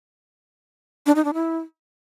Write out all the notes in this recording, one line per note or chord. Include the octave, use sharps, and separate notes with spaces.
D4
D#4
D4
E4